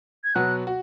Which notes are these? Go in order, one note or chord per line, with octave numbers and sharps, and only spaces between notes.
G#6
B2 F#3 B3 F#4 F#6
F#4